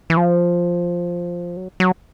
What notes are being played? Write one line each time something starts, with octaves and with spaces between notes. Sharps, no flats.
E3
F3
F#3
F#3